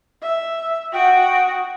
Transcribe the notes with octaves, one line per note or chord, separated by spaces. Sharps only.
E5
F#4 F#5 G5 D#6